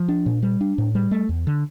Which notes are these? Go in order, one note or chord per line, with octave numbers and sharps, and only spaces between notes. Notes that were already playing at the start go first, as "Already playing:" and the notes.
Already playing: F3
D4
A#2
G3
D4
A2
G3
A3
E2
D3